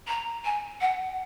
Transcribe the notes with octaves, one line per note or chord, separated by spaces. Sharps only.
A#5
G#5
F#5